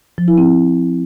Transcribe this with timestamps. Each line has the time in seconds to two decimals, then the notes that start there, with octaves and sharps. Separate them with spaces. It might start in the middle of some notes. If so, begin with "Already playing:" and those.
0.18 F3
0.28 E4
0.38 C4